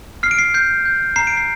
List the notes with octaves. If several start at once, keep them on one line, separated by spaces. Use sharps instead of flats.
F6 C7
D7
C7
G6 C7
G6
A#5 C7
D7
C7